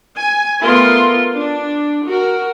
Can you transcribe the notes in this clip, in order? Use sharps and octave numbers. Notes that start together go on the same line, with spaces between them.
G#5
A3 B3 F4 A#4 C6
D4
F#4 A#4